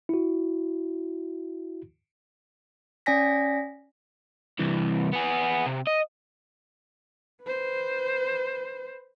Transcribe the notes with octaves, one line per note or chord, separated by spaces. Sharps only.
E4 F#4
C#4 D5 G#5 A#6 B6
C2 E3
B3 G#4
C3
D#5
B4 C5